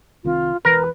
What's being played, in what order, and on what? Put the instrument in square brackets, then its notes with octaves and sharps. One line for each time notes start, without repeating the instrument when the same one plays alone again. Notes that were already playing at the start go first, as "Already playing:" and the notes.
[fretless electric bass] C2 D#3 C4 [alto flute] F4
[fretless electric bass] E1 E3 [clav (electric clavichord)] A#4 [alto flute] B4